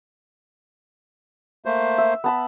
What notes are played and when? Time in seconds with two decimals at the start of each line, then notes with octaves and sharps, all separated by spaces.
1.65 A3 A#3 C5
1.98 E5
2.24 B3 A5 B5